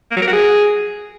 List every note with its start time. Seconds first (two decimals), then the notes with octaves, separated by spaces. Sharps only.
0.11 A#3
0.17 F#3
0.22 A#4
0.28 F#4
0.33 G#4